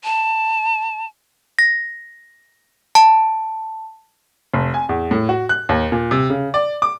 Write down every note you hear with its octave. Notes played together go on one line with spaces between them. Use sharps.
A5
A#6
A5
F1
G#5
E2
A2
F#4
F#6
D#2
A#2
C3
C#3
D5
D6